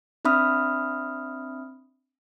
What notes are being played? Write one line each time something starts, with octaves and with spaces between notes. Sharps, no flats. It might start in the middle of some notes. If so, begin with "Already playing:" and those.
C4 D4 E5 B5 D#6 F6